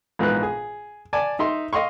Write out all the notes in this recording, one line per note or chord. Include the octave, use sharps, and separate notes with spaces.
A#1 G#2 E3 B3 F#6
G#4
D5 G#5 A5
D#4 E5 C6
D#5 F5 C6 C#6